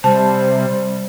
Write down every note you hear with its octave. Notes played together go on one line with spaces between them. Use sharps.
C3 G3 C5 A5